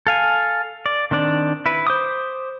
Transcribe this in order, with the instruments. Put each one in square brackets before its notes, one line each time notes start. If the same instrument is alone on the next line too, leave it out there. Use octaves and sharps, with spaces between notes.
[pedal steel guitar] A4 F5 G#5
D5
D#3 C4 D4 D5
E4 B4
C5 D6 D#6